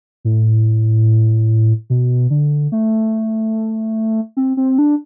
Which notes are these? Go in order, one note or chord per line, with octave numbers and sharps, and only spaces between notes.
A2
B2
D3
A3
C4
C4
D4